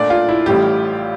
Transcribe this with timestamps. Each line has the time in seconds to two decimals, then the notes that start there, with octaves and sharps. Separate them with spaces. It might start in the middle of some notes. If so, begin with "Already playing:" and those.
Already playing: A#2 A3 D4 D5
0.10 F4
0.29 E4
0.46 A1 A2 G3 G4